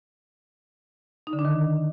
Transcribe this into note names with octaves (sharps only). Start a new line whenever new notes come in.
D#4
D3
D4
D#3